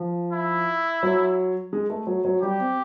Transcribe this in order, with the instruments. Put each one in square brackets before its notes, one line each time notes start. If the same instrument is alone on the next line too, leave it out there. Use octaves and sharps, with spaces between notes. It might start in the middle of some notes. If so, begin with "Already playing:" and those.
Already playing: [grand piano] F3
[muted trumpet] E4
[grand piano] F#3
G#3
A3
F#3
F#3
[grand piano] G3 [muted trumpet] G4
[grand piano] C4